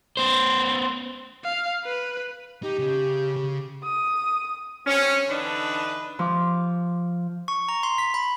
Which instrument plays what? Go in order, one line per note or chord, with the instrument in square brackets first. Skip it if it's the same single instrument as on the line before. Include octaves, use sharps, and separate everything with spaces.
[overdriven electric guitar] B3 C5
[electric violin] F5
B4
[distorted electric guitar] D#4 [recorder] G4
[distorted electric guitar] C#3
C#3
[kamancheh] D#6
[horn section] G2 C4 C#4
D3 E3 D4 D#4 B4
[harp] F3 D6
[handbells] C#6
A#5
C6
B6
B5